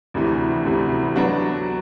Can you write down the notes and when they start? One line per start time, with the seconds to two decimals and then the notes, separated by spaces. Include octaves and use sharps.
0.14 D2 C3 E3
0.65 D2 C3 E3
1.16 F#3 B3 D4 F#4